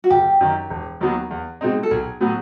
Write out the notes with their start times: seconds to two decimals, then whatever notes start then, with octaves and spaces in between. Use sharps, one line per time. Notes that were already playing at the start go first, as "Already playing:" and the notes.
0.04 F#4
0.10 F#1 G4
0.41 F#2 D#3
0.70 E1
1.01 D#2 D#3 F#3 B3
1.31 E2
1.61 B2 G#3 C4 D#4
1.83 A4
1.91 B1 G#4
2.21 A2 F#3 B3